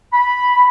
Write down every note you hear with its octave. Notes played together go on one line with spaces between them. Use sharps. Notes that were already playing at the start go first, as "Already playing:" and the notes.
B5